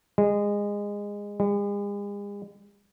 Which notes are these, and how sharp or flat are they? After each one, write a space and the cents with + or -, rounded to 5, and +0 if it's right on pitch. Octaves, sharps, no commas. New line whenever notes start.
G#3 -20
G#3 -40